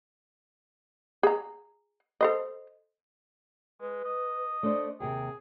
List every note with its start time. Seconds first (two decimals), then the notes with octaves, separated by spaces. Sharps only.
1.23 G#4 A#5
2.21 A4 C5 D#5
3.81 G#3 B4
4.04 D#5
4.63 A3 D4 C5 D5
5.00 D#2 C3 G#4 G5